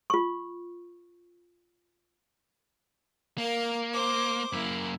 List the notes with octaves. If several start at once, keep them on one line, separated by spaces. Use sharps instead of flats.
F4 C#6
A#3 A#4 F5
C5 D6
F#2 A#3 E4